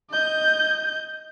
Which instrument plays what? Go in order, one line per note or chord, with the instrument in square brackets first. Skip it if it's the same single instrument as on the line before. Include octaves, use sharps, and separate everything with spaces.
[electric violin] D#5 G6